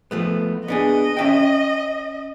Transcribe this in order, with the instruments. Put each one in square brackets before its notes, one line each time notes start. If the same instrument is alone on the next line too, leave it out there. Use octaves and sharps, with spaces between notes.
[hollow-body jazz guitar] F3 A3 B3
[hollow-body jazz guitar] B3 D4 G#4 [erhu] D#5
[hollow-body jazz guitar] C#4 E5 G5